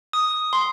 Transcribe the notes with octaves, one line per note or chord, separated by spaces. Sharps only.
D#6
C6